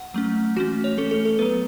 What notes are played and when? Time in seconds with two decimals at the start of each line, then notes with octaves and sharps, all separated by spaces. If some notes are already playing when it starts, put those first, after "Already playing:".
Already playing: F#5
0.14 F#3 A3 C#4
0.56 E3 A3 C#4 F#4
0.84 C#5
0.97 E3 A3 C#4 A4
1.11 A4
1.25 A4
1.39 F#3 B3 B4